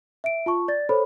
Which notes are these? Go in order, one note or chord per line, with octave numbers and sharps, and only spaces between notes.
E5 D7
F4 A5 C#6
D5 A6
A4 C5 C#5 B5